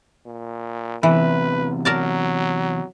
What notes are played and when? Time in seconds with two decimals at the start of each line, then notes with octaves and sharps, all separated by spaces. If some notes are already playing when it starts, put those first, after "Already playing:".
0.26 A#2
1.03 E2 C3 E3 B4
1.85 F#3 A#4 D5 A5